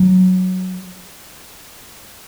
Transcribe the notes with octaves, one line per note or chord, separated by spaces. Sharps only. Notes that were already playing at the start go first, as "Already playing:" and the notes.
Already playing: F#3